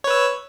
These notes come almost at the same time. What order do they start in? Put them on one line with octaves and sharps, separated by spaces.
C#5 B4 E6